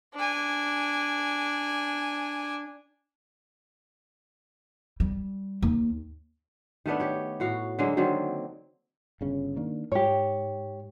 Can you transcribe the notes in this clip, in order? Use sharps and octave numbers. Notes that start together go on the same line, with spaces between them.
D4 G#5
G3
D#2
D#3 A3 B3 D4
G4 C#5
A2 F#4 F5
D3 F#3 G#3 A#3
D3 D#3 F#3 C4
G1 C#3 C#4
D#3 A#3 D4
G#2 G4 C#5